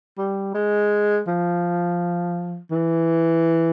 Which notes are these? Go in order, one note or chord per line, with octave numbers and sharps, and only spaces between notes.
G3
G#3
F3
E3